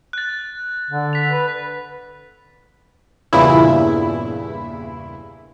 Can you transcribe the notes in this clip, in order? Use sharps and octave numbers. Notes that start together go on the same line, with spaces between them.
F#6 A6
D3
B6 F7
B4
E2 G2 A#2 C#3 E4